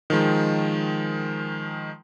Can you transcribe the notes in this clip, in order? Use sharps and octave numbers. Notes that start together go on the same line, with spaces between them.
D#3 F3 G#3